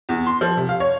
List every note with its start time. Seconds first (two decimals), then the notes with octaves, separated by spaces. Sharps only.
0.09 E2
0.27 C6
0.41 F3
0.57 C3
0.69 F5
0.80 C#5